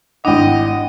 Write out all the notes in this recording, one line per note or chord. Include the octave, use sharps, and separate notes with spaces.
G#1 D4 E4 D#5 F#5 G5